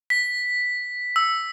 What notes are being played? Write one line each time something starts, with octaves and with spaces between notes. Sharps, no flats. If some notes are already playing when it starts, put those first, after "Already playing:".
B6
E6